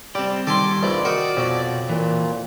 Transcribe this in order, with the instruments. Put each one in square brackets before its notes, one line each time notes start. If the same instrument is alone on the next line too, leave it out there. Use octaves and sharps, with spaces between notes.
[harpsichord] G3 [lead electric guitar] C4 G4
[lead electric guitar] D#3 G3 [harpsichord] A4 G#5 C6 [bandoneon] D6
[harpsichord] A#1 F2 E3 [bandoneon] D5
[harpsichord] D#4 A#4 [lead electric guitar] F#4
[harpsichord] F2 F#3 [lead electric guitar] B2
[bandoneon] A#2 [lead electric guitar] E3